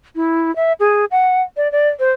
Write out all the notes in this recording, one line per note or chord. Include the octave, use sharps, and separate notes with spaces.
E4
E5
G#4
F#5
D5
D5
C5